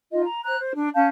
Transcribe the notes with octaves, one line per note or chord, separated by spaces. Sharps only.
D#4 F4 D#5
A#5
C5 A#5 F#6
C5
D4
C#4 F5 A5 G6